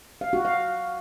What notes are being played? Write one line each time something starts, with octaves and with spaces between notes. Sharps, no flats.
F5
F#4
F5